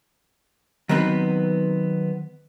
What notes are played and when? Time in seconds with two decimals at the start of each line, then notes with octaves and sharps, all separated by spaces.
0.89 D#3 F#3 B3 C4 D#4 B4